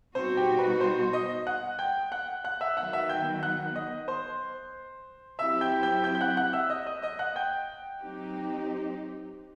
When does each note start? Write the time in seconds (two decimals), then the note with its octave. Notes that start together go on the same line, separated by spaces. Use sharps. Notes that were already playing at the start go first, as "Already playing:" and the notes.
0.15 B2 G3 C4 D#4 F#4 C5
0.37 G4 G5
0.59 B4 B5
0.80 C5 C6
1.13 D#5 D#6
1.47 F#5 F#6
1.79 G5 G6
2.12 F#5 F#6
2.44 F#5 F#6
2.61 E5 E6
2.77 D#3 F#3 B3 F#5 F#6
2.93 E5 E6
3.09 G5 G6
3.43 F#5 F#6
3.76 D#5 D#6
4.08 C5 C6
5.39 F#3 C4 E4 G4 E5 E6
5.61 G5 G6
5.83 G5 G6
6.04 G5 G6
6.15 G6
6.21 F#5 F#6
6.37 F#5 F#6
6.53 E5 E6
6.70 D#5 D#6
6.86 D#5 D#6
7.02 D#5 D#6
7.19 F#5 F#6
7.36 G5 G6
8.02 F#3 C4 D#4 G4